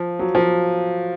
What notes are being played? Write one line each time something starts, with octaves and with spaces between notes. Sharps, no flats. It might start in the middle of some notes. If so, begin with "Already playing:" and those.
Already playing: F3
F#3
F3